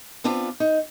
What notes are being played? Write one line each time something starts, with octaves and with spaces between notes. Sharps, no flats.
B3 C4 D4 F4 B4
D#4